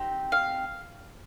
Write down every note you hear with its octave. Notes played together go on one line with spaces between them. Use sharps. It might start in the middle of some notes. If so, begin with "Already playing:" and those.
Already playing: C4 D#4 G4
F5